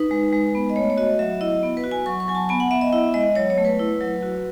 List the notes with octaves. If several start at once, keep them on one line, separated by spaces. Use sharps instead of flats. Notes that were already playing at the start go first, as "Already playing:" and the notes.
Already playing: D#4 B4
G#3
G#3
B3
D#5
A3 C#5
C#5
F#4 D#5
F#3 E5
E4 D#5
B3
B4
F#4
G#5
F#3 C#6
C#6
F#3 G#5
A5
B3 G#5
F#5
B3 E5
D#5
E4 E5
G#3 D#5
F#3 C#5
C#5
A3
B4
E4
F#3
F#4